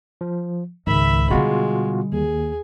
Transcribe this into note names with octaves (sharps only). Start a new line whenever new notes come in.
F3
C#2 G#2 D#3 E5 B5
B2 D3 G3 G#3 F4 F#4
D#2 G#4